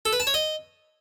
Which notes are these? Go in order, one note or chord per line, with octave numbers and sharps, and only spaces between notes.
A4
B4
A5
C#5
D#5